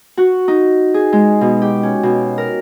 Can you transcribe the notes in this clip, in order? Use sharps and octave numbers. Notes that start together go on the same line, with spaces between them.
F#4
D#4
G#4
G#3
B2
G4
C#4
B2
A#4